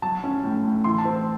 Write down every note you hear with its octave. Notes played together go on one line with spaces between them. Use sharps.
F#3 A5
C#4
A2
A2
E3 C6
A5
C4